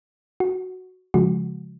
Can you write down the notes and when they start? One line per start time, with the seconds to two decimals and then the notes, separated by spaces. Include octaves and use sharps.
0.40 F#4
1.14 C#3 F3 G#3 F#4